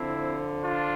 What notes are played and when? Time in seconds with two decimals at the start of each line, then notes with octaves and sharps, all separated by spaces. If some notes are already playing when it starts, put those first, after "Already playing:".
Already playing: D3 F3 C4 E4
0.63 D4 F4